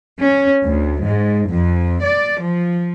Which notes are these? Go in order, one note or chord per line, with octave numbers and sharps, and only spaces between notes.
C#4
D2
G#2
F2
D5
F3